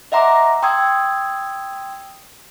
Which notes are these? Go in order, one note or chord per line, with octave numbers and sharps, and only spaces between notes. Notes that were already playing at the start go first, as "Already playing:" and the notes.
D#5 E5 F#5 A#5 C6 D6
G5 C6 D#6 E6 G#6